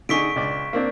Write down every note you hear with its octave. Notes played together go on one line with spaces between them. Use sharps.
D3 D#4 G#4 C#6 B6 D7
C#2 D5
A#3 C4 D4